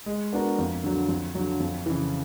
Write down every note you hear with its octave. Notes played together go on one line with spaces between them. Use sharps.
G#3
B3 D4 F#4 A#4
F2
D3 F#3
F2
D3 F#3
F2
C#3 E3